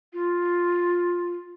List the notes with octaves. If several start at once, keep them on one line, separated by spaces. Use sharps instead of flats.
F4